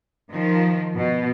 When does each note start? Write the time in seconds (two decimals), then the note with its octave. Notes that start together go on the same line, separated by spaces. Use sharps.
0.32 D#3 F3
0.96 B2